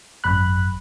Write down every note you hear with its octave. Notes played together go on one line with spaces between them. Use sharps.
G#1 F#2 B5 F#6